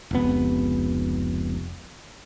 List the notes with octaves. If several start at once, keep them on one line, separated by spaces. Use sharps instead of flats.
F1 C#2 B3